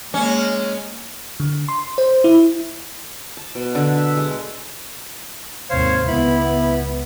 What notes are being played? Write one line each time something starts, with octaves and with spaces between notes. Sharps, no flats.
G#3 A#3 C#4
D3
C6
C5
E4
A5
B2
D3
E5
G#3
G#1 D#2 C3 C5 C#5 F5
C#2 B3 E4 B5